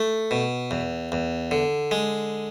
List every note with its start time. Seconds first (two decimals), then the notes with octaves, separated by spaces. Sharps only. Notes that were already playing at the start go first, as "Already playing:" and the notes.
Already playing: A3
0.31 B2
0.71 E2
1.12 E2
1.51 D3
1.91 G#3